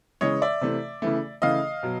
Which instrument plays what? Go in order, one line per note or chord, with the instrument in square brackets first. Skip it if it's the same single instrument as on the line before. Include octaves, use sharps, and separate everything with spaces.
[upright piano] C#3 E3 G#3 C#5 D#5
D5 E5
C3 E3 A3
C#3 E3 A3
C#3 E3 A3 D#5 F5
B2 F#3